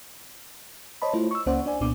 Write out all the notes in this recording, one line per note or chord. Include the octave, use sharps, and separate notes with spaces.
C5 C#5 D#5 A5 B5
A3 E4 F4 C5
C#6 E6
C#2 A#3 C#4 C5 D5 F#5
D4 D5 G#5
C2 A#2 B3 D4 D6